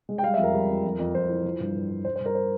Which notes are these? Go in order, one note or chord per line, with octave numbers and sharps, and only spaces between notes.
G#3
G5
G3 F5
F2 E5
A#4
G3
F2
F2
F2
F2 C5
E3
F3
G2
G2
G2
G2 C5
C5
G2
A#4
C5